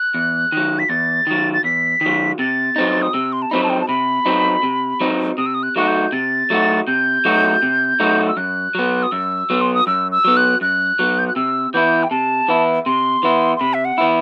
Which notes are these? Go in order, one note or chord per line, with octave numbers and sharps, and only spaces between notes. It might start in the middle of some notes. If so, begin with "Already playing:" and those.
Already playing: F#6
E2
D#3 F#3
B6
E2 A6
D#3 F#3
A6
E2 B6
D#3 F#3
C3 A6
F#3 C4 D#4
D#6
C3 E6
C6
A5
F#3 C4 D#4 B5
A5
G5
A5
C3 B5
F#3 C4 D#4
C3
F#3 C4 D#4
C3 D#6
E6
D#6
F#6
F#3 A3 D#4 F#4 F#6
G6
C3 A6
F#3 A3 D#4 F#4
C3 G6
F#3 A3 D#4 F#4
C3
F#3 A3 D#4 F#4
E6
F#2 F#6
F#3 B3
D#6
F#2 E6
F#3 B3
C6
D#6
F#2 E6
E6
F#3 B3
F#6
F#2 F#6
F#3 B3
G6
F#6
C3 E6
E3 B3 E4 G6
G5
C3 A5
E3 B3 E4
C3 C6
E3 B3 E4
C6
C3 B5
E5
F#5
E3 B3 E4